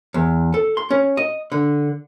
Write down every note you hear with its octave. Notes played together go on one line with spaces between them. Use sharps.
E2
A4
C6
C#4
D#5
D3